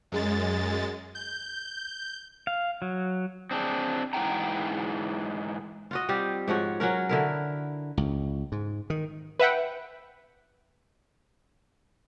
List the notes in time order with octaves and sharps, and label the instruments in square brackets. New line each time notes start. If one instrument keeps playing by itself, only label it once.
[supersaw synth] F#2 G#3 A6
G6
[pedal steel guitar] F5
F#3
[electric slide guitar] C4 D4 G#4
G#2 E3 G4 F#5 G5 A#5
[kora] F4 F#4 D#5
G3 C4 F4 G4
G#2 F3 F#4 C#5
F#3 C#4 F#4 A#4
D3 E4 A#4
[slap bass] C#2
G#2
D#3
[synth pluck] B4 E5 F#5 G5